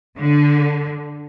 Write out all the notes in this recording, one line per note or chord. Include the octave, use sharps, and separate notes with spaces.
D3